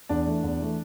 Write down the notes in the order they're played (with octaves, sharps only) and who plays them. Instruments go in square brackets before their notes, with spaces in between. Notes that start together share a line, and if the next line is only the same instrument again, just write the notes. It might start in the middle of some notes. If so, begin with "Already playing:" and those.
[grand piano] E2 [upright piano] D4
[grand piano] E3 A3
E2
E3 A3